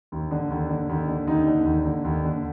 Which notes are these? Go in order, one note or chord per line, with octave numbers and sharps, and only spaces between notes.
D#2
D3
D#2
D3
D#2
D3
D#2 D#4
D3
D#2
D3
D#2
D3